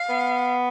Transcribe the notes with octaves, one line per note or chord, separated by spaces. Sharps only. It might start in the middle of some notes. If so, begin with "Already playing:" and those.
Already playing: F5
B3